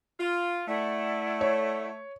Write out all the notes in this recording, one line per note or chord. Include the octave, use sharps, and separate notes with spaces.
F4
A3 E4 D5 F#5
C#5